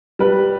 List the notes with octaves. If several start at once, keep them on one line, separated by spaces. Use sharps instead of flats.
G3 B4